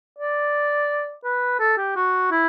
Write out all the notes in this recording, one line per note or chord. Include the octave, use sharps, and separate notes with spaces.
D5
B4
A4
G4
F#4
E4